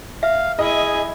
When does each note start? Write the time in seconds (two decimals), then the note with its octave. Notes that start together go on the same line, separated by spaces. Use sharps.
0.23 E5 F5
0.59 E4 G#4 D#5 G#5